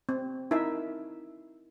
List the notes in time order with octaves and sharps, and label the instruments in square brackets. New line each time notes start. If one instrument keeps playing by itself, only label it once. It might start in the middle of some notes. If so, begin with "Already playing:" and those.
[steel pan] C4
D#4 E4 A#4 E5